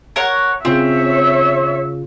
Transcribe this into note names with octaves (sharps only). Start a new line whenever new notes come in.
A#4 C#5 F#5
C#3 C4 F4 C#5 E5